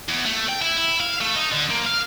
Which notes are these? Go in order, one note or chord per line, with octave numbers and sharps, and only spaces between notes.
E2
A3
G5
E4
E4
F5
A3
D#4
D3
A#3
F5